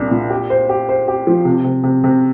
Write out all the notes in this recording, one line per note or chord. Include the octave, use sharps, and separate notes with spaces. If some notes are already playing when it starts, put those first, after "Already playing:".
Already playing: C2 A#2 D4
A#2
G4
C5
G4
C5
G4
F3
C3
C3
C3
C3